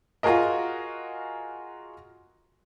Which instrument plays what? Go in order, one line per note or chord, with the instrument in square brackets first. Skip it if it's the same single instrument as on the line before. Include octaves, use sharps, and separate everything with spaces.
[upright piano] F4 F#4 G#4 A#4 D#5